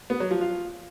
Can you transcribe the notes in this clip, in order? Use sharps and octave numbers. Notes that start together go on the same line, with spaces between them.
B3
F#3
F3
F4